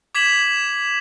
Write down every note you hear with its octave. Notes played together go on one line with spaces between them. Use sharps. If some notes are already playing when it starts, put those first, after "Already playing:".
D6 G#6 B6 E7 F#7